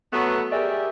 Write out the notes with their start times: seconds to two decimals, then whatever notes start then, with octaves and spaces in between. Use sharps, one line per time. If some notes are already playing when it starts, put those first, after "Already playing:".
0.13 F#3 A3 B3
0.52 G4 G#4 A#4 D5 E5